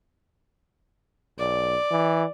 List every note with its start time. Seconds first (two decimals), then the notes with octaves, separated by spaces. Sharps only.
1.38 B1 D5
1.91 E3